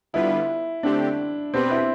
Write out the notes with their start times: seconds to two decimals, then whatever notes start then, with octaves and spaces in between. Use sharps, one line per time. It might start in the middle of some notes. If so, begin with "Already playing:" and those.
0.13 D3 G3 B3 E4 F4 B4
0.83 D3 A3 C4 D4 G4
1.54 B2 B3 C4 D4 G4 B4
1.71 E4